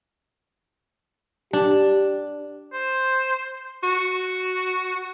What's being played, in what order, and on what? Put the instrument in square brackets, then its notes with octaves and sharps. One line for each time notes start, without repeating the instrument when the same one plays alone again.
[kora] D4 [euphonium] G4
[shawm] C5
[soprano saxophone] F#4